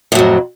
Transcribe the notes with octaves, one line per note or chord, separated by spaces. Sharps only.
F2 A2 F#3